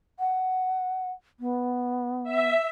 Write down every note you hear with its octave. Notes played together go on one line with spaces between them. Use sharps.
F#5
B3
E5